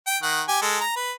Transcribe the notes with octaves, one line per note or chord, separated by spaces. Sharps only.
G5
D#3 F#5
G4 G#5
G#3 A4
A#5
B4